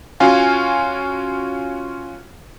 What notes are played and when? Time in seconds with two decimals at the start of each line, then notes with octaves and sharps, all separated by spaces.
0.20 C#4 F4 F#4 F5 G#5